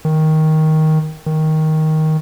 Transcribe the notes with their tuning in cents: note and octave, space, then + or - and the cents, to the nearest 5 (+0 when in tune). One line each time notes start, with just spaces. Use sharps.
D#3 +10
D#3 +10